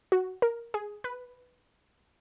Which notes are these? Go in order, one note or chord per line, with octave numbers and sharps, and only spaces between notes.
F#4
A#4
G#4
B4